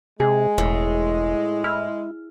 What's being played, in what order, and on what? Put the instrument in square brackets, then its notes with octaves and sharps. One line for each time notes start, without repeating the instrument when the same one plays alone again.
[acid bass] C3 [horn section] G#3 [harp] G#4
[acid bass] E1 [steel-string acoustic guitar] A2
[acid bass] E4 [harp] F6